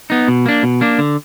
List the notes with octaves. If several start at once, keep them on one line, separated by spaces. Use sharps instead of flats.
B3 D#4
B2
A#3 D4
B2
A#3 D4
D3